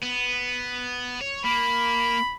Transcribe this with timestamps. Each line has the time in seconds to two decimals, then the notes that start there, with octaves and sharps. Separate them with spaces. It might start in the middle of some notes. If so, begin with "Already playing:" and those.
0.03 B3
1.21 C#5
1.45 A#3 B5